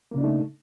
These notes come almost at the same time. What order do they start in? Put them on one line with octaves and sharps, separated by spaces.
A#3 C#3 D4 D#4 A3